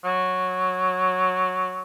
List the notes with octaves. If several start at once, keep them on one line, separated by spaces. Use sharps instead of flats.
F#3